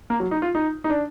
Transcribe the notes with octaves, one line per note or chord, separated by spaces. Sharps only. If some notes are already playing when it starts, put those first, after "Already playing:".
A#3
F#3
D#4
F4
D#4
D#4
D4